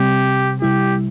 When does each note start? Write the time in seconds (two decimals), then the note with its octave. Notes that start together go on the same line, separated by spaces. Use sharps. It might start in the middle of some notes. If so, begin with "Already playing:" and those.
Already playing: C3 G3 C4 G4
0.62 C3 G3 E4 G4